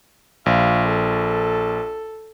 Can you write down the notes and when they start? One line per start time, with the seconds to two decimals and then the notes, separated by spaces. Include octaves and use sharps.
0.46 A#1 F5
0.87 A4